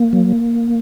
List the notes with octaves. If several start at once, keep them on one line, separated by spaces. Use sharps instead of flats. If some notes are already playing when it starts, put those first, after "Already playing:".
Already playing: A#3
F#3